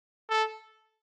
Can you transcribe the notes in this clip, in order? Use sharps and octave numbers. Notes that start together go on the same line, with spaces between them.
A4